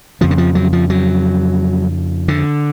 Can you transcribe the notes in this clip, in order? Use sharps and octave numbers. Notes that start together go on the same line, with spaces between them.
F2 C#3 F3
D3
F3
F#3
F3
F#3
D3